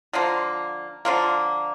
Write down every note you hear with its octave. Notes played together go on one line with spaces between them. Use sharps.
D3 F3 A#3
D3 F3 A#3